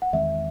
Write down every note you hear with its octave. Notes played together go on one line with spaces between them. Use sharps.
F#5
E2 D#3 G#3 C4 E5